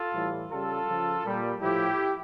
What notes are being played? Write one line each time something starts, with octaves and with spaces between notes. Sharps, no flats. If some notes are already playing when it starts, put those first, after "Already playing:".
Already playing: F4 A4
A2 E3 G3
C#3 G3 F4 A4
C#3 F3
A#2 G3
A2 F3 E4 G4